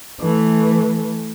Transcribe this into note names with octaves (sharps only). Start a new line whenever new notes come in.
E3 A3